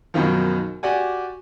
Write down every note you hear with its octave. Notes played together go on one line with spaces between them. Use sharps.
F#2 B2 D#3 F3
F#4 G4 D5 F#5 G#5